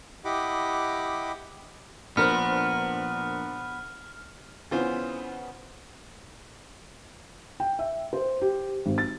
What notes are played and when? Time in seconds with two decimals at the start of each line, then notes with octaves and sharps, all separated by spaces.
0.25 E4 G4 D#5 F#5 B5 D6
2.17 A#2 F3 B3 D4 A#4 C5 F6
4.71 C#3 E3 B3 C#4 F4 C5
7.60 G5
7.79 E5
8.13 C5
8.42 G4
8.86 G#1
8.98 A6